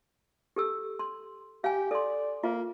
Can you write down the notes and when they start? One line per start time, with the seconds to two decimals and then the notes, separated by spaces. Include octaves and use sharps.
0.56 G4 A4 E6
0.99 C6
1.64 G4 F5 G#5
1.91 A4 D5 C6
2.43 A#3 F4